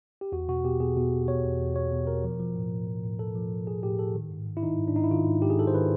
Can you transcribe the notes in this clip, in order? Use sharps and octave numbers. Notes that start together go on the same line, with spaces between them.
G4
E2 F#4
B2 F#4
B2 G4
B2 G#4
B2
E2
B2 C#5
E2
E2
B2 C#5
B2
B2 A#4
F3
F3
A2
A2
F3
A2
F3 A4
F3
A2
A2 G#4
A2 G4
A2 A4
D#3
G#2
G#2
E4
D#3 D#4
G#2
D4
G#2 D#4
E4
D#3 F4
G#2
G#2 G4
G#4
D#3 A4
C5
D#3 B4